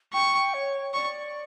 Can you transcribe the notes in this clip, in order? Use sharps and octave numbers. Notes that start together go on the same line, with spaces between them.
G5 C#6
C#5
D5 C#6